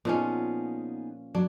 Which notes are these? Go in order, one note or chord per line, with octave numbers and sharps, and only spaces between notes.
A#2 F3 B3 C#4 D#4 G#4
F#3 D4